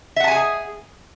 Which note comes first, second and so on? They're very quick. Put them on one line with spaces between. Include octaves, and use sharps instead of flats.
E5 F#5 A5 G#5 G#4